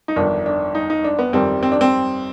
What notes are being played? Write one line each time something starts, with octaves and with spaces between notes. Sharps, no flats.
D#4
G1 F2 D#3 D4
D4
D#4
D#4
D4
B3
G1 F2 D#3 G3 C4
C4
D4
C4